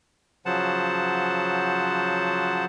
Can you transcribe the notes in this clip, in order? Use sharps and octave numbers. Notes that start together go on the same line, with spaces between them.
C#3 F3 F#3 C5 F#5 A5